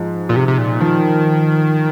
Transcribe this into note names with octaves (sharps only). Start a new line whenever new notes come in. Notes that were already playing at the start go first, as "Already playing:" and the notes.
Already playing: G#2 F3 G#3
A#2
C3
C3
A#2
D#3 F3